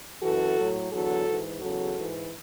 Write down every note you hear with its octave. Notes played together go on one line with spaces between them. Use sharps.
F#2 E3 F#4 A4
A2 F#3
E2 D3 F#3 F#4 A4
G#2 E3
E2 C#3 F#3 F#4 A4
G#2 E3